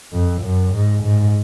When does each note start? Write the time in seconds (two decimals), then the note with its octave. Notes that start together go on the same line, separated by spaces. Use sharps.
0.12 F2
0.42 F#2
0.73 G#2
1.03 G#2